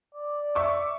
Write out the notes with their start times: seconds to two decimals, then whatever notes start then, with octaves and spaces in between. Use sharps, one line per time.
0.15 D5
0.55 E5 C#6 D6